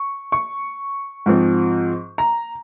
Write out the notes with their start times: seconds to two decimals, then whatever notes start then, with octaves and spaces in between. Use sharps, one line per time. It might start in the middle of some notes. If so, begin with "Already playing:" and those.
Already playing: C#6
0.32 C#6
1.26 G#2 F3 C4
2.18 A#5